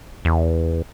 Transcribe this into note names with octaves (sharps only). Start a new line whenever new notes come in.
E2